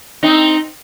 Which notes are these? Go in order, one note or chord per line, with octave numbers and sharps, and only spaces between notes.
C4 D#4